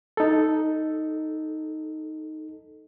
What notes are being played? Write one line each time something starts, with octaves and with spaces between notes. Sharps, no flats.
D#4 A4